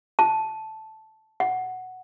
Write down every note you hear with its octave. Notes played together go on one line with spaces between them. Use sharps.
A5
F#5